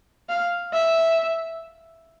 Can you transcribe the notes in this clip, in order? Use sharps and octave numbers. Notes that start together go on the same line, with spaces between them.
F5
E5